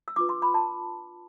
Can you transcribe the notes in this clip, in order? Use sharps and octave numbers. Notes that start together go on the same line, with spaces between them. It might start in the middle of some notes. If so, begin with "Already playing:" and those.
E6
D4 F4 B4 D6
C6
B5
A5